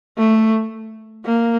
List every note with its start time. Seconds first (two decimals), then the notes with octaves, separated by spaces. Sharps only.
0.18 A3
1.25 A#3